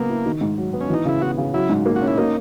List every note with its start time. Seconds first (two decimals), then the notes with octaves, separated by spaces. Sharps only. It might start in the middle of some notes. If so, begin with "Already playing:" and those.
Already playing: C#3 F#3 A#3 B3
0.09 E4
0.26 D#3
0.41 G#2
0.57 F#3
0.73 B3
0.81 C#4
0.90 E3 D#4
1.05 C#3 E4
1.21 B3 F#4
1.38 C#3
1.53 F#3 E4
1.70 G#2
1.86 A#3
1.96 F#4
2.02 C#4
2.07 E4
2.18 A#3 D#4